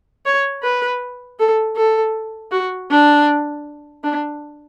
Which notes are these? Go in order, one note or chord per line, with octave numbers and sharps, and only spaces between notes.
C#5
B4
A4
A4
F#4
D4
D4